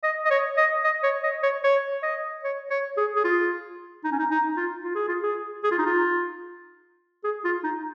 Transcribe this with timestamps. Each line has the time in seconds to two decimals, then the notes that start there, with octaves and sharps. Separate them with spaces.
0.03 D#5
0.25 D#5
0.30 C#5
0.57 D#5
0.84 D#5
1.03 C#5
1.24 D#5
1.43 C#5
1.64 C#5
2.03 D#5
2.44 C#5
2.70 C#5
2.97 G#4
3.16 G#4
3.24 F4
4.04 D#4
4.12 C#4
4.19 D#4
4.31 D#4
4.57 F4
4.84 F4
4.95 G#4
5.08 F4
5.23 G#4
5.64 G#4
5.72 F4
5.79 D#4
5.86 F4
7.24 G#4
7.44 F4
7.64 D#4